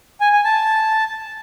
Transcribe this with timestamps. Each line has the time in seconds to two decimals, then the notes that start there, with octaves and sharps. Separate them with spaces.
0.21 G#5
0.33 G#5
0.45 A5